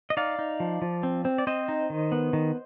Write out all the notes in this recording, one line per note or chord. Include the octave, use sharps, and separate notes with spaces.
D#5
D#4 D5 F5
D#4
F3
F3
C4
C4
D5
C4 C5 D#5
D#4
D#3
B3
D#3